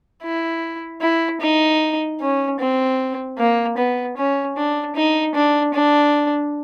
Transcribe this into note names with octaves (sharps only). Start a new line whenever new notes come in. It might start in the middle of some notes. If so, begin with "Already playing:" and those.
E4
E4
D#4
C#4
C4
A#3
B3
C#4
D4
D#4
D4
D4